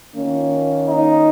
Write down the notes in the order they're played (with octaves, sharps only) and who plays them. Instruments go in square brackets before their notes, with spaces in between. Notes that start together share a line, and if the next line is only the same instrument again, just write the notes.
[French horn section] D#3 A#3 C#4 F4
[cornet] D#4